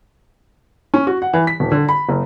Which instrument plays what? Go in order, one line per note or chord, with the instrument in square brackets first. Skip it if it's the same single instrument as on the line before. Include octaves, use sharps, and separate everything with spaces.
[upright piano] C#4
F#4
F#5
E3
B6
D#1
D3
B5
F#1